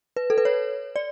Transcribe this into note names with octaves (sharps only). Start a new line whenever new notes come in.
B4
A4
B4
C#5
D5